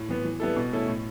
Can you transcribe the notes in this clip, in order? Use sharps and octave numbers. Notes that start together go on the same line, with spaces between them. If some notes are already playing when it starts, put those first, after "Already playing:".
Already playing: A2
E3 B3
E3
G3 B3 E4 A4
B2
A3 C#4 E4 A4
A2